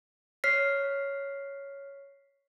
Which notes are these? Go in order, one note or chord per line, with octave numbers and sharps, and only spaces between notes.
C#5 F6 B6 C7